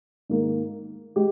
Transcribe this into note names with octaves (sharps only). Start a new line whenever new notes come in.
G#2 D#3 A#3
G#3 G4